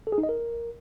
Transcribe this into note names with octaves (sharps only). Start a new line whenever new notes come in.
A4
G#4
D#4
D#5
A#4